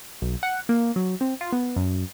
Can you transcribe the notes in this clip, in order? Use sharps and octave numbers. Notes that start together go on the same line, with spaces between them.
B1
F#5
A#3
F#3
C4
F4
B3
F#2